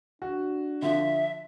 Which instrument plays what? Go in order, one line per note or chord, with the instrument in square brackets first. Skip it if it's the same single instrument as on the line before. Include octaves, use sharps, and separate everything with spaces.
[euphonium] D4 [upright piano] F#4
[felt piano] D3 F3 [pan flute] E5